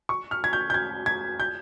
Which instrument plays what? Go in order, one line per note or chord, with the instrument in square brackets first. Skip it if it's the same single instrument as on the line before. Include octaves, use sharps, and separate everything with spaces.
[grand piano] C#6
F6
G#6
G6
G6
G#6
G#6
G6